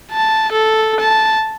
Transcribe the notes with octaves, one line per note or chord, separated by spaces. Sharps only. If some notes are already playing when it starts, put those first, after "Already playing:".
A5
A4
A5